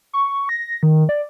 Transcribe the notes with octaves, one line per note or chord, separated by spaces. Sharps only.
C#6
A#6
D#3
D5